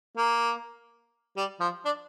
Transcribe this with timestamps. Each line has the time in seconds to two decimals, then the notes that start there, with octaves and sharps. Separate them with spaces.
0.17 A#3
1.37 G3
1.60 F3
1.85 D4